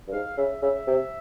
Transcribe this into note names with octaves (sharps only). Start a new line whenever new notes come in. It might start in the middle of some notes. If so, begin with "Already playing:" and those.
G2
G#2 F5
C#3 E5
C#3 E5
C3